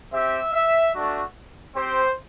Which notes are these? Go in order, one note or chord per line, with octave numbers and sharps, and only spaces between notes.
C4 G4 E5
E5
A3 D4 F#4
C4 G4 C5